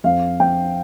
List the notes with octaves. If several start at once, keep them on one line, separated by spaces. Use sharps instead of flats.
F2 F5
F2 G5